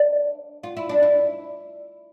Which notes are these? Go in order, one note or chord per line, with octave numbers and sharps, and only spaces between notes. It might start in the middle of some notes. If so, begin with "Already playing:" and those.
Already playing: D4
F4
E4
D4
E4